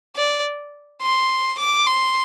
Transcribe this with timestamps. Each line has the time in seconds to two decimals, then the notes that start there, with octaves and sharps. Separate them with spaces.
0.16 D5
1.02 C6
1.59 D6
1.87 C6